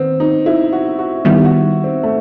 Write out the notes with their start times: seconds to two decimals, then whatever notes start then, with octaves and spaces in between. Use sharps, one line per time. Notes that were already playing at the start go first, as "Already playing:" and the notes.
Already playing: D#3 B3 C4
0.20 D#4
0.46 E4
0.72 F#4
0.99 F#4
1.25 D#3 G3 B3 E4
1.45 F#4
1.84 C4
2.03 A3